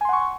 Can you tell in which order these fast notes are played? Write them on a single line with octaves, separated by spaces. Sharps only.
G#5 C6 F#5 C#6